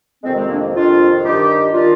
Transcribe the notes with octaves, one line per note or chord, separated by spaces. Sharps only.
F2 C3 D#3 G#3 C4
G#3 C4
A#3 D4
F2 C3 D#3 D4 F4
G2 D#3 D#4 G4
D#3 D4 F4